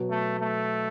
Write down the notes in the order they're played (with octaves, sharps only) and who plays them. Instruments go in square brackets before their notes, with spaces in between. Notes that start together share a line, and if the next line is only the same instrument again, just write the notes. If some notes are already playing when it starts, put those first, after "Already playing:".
Already playing: [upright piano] B2 F#3 B3
[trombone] A3
A3